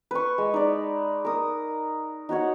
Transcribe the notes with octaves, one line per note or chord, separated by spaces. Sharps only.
B4 C#6
G#3
D#4 D5
A#4 D#6
D#4 F#4 C#5 F#5